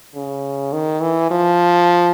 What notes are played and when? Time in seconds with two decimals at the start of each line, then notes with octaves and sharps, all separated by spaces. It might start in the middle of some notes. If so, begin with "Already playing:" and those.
0.15 C#3
0.73 D#3
1.02 E3
1.31 F3